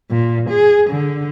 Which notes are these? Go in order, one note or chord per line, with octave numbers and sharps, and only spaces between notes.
A#2
G#4
D3